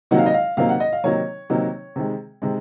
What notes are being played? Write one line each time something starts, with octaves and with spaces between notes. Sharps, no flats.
C3 D#3 F#3 A#3 D#4 F#5
F5
D#5
F5
C3 D#3 F#3 A#3 D#4 F5
F#5
D#5
F5
C3 D#3 F#3 A#3 D#4 C#5
C3 D#3 F#3 A#3 D#4
C3 D#3 G#3
C3 D#3 G#3